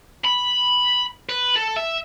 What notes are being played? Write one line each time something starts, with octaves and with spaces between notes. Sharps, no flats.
B5
B4
A4
E5